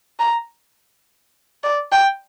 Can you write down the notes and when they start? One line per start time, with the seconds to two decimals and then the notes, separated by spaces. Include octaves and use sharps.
0.19 A#5
1.63 D5
1.92 G5